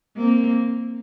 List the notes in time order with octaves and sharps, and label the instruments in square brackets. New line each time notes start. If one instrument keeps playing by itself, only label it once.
[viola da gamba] A#3 C4